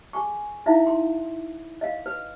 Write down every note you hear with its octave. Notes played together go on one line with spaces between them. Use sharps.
G#4 G#5 C#6
D#4 E4 E5 F5
C6
D#5 F5
B4